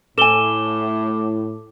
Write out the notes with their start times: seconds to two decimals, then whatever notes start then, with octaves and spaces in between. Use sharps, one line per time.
0.18 A2 A4 G#5 D6 E7 G7